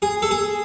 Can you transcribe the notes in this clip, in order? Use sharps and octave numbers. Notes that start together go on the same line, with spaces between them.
G#4
A4
G#4